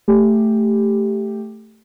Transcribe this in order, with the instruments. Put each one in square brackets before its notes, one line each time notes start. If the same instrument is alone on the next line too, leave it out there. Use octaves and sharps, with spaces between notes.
[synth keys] A3 G4